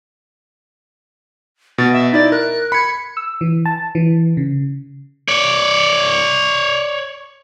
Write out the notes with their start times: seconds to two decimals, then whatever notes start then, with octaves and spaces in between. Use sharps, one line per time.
1.78 B2 A6
1.93 E5
2.12 D#4 E4 D5 A6
2.32 A#4 F#6
2.72 B5 G#6 C#7
3.17 E6
3.41 E3
3.66 A5
3.95 E3
4.37 C#3
5.29 C#5 D5